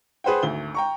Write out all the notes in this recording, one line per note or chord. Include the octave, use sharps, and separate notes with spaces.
G#4 B4 C5 F#5 G5
G#1 D2 G7
G5 A#5 C#6